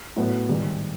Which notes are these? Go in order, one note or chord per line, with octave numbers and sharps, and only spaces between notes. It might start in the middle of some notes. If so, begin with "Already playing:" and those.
A2 F#3 B3
G#2 D#3 G3